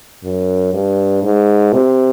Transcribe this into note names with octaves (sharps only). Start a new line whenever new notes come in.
F#2
G2
G#2
C3